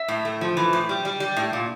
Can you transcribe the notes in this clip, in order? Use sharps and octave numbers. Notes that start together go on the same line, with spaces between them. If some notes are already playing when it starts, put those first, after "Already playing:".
Already playing: E5
A2
A3
F3
E3
A2
G3
G3
G3
A2
A#2